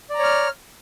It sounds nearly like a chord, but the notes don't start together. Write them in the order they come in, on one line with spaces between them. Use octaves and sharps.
D5 A#5 C#5 F6